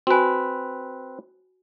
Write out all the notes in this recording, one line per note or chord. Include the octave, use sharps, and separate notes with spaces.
C4 F#4 B4 G#5